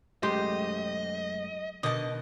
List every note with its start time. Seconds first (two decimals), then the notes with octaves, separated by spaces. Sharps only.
0.23 F#2 G#3 A3 G4 C5 D#5
1.83 B2 D3 D#3 D#5 A5